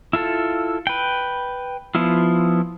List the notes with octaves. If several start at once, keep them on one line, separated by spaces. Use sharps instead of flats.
E4 F4 A4
B4 G5
F3 B3 E4 F4